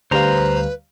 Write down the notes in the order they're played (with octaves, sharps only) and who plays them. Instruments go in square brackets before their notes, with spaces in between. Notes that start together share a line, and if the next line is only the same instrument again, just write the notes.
[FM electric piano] D2 G3 F5 [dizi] B4 [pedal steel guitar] C5 A#5